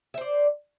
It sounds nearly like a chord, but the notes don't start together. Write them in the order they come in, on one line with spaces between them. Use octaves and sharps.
E5 C5 D5